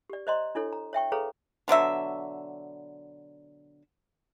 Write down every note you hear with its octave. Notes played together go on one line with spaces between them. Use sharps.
G4 D5
C5 D5 D#5 A#5 C6
D4 E4 A4 C#5
A#5
C#5 E5 G5 C#6
G#4 A4 B4 C#5 F5 A#5
B2 D3 F#3 E5